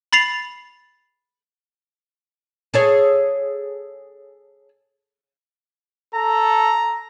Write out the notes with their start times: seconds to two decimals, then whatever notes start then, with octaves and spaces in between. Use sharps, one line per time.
0.13 B5 A6 C7 F7
2.74 G#4 A4 C#5
6.15 A4 A#5